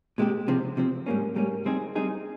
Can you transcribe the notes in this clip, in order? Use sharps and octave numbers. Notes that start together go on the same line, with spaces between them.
A#2 G#3 C4 G4
C3 F3 C4
C3 F3 C4
G#2 G3 A#3 C#4
G#2 G3 A#3 C#4
G3 C4 D#4 G#4
G3 C4 D#4 G#4